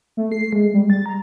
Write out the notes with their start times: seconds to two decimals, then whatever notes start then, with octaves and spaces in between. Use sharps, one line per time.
0.17 A3
0.32 C7
0.53 G#3
0.74 G3
0.90 A6
1.06 A#5